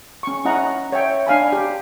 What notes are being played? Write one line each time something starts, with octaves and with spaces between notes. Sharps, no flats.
C#4 C#6
C#4 E4 D#5 F#5 A#5
C#5 E5 G5
D4 F5 G#5 B5
G4